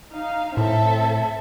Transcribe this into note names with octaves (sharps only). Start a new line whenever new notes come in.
D#4 F5
A2 C4 A4 E5